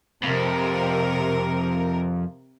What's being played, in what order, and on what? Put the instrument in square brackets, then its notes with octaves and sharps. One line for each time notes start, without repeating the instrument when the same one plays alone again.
[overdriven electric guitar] F2 [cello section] C3 A#4